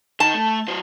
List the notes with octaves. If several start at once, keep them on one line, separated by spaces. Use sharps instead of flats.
D#3 A5
A3
F#3 C5